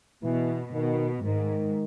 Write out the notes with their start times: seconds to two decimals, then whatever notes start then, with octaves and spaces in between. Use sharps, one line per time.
0.23 B2 E3
0.74 B2 D#3
1.24 G#2 D#3